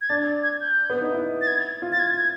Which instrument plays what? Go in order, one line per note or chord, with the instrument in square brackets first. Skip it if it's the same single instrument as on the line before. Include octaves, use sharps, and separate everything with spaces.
[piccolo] G#6
[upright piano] D4 [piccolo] A6
[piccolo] G#6
G6
[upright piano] B3
D#4
E4
[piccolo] A6
G#6
[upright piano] F4
[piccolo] A6
G#6
G#6